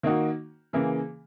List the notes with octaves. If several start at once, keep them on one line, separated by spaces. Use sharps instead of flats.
D#3 A#3 D#4 F#4
C#3 E3 A#3